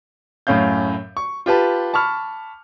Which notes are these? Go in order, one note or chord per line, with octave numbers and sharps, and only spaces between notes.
F#2 A2 C#4 F5 G6
C#6
F4 G4 B4 A5
A5 B5 C#6 F6